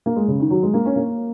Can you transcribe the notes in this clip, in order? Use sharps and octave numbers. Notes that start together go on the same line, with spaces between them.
A#3
G#3
C#3
D#3
F#3
G#3
A#3
C#4
A#3